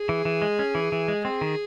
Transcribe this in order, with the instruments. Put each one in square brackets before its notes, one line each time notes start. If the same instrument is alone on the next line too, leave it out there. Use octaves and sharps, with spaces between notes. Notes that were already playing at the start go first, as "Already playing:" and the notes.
Already playing: [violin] G#4
[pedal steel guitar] E3
E3
G#3
C#4
E3
E3
G#3
[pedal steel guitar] C4 [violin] G#4
[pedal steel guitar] D#3